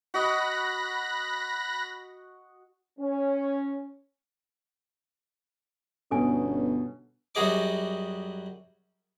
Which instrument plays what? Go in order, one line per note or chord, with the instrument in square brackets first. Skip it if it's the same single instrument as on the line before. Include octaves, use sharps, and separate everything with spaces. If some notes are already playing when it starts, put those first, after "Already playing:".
[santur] F#4 D#5 [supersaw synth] B5 F#6 A#6
[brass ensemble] C#4
[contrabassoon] G1 [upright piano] B2 [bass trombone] C#4 [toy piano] A4 G#5
[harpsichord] F#2 G3 F#4 G#4 D#5 D6